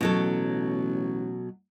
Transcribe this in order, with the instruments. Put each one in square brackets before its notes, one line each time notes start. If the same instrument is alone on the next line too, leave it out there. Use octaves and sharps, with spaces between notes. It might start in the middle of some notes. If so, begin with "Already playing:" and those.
[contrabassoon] A1 [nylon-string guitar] B2 F#3 A4